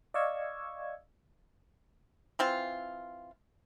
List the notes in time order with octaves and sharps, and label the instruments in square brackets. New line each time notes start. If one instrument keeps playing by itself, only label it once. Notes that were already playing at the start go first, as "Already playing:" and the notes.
[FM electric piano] D5 D#5 F5 C#6 E6 G#6
[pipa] E3 C4 F4